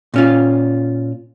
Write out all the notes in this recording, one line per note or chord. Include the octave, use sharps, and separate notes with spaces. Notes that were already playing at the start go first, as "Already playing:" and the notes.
A#2 C#4 F4